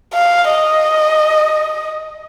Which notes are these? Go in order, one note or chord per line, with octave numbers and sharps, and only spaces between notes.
F5
D#5